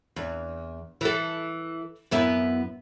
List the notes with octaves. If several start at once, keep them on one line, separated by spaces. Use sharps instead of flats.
E2
E3 A4
F#2 B3 E4